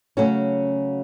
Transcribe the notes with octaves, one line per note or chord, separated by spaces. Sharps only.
C#3 F#3 A3 C#4 F#4